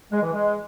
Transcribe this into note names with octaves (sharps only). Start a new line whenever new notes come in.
G#3
E3
G#3